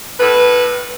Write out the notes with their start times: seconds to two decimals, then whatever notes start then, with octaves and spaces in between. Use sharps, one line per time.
0.19 A2 B4